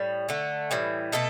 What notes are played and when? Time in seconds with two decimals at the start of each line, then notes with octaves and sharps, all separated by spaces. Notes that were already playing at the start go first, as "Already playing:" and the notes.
Already playing: A2 G3
0.29 D3 A3
0.71 A2 E3 G3
1.12 B2 A3 A4